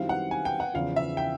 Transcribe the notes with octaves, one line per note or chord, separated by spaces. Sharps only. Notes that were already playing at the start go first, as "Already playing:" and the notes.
Already playing: F#2 D#3 G3 C4 E4 F5
F#5
G#5
G5
F#5
E2 C#3 F3 F5
E5
G5